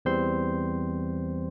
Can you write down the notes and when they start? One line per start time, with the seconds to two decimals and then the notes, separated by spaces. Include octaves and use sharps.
0.05 E2 E3 G3 C4 C5 C6